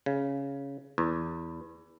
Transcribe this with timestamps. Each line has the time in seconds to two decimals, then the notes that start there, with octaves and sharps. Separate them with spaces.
0.06 C#3
0.98 E2